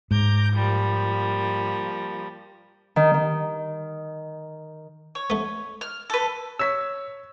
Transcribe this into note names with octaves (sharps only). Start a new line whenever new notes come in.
G#2 A#5 D6 G6
F3 G3 A#3
D#3
D#3
C#5
A3 B3
F6
A4 B4
C#5 E6 B6